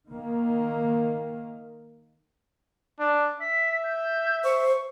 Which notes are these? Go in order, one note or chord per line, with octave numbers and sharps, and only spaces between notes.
D#3 A#3
D4
E5 B6
G6
C5 C#6